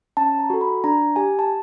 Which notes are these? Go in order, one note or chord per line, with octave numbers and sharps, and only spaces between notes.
C#4 A5
A#5
F#4 A4
B5
D4 A#5
G4 G#5
A5